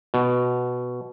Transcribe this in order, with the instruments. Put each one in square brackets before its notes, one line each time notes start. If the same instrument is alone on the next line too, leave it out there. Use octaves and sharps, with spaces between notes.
[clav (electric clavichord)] B2